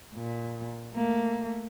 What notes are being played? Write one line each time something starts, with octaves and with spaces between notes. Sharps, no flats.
A#2
A3 A#3